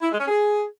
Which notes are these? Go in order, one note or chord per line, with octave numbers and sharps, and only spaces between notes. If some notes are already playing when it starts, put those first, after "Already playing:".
E4
G#3
C#4
G#4